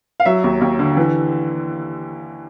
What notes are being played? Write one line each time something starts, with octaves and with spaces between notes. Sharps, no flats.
F5
F#3 E5
D#2
D#2
D3
E3